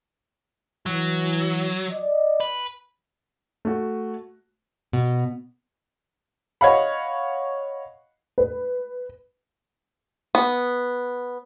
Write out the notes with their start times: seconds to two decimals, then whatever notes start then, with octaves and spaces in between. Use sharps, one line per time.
0.86 E3 F#3
1.92 D5 D#5
2.40 B4
3.65 A3 F#4
4.93 B2
6.61 C#5 D#5 F5 F#5 B5
8.38 B4
10.35 B3